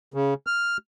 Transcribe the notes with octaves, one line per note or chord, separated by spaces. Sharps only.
C#3
F6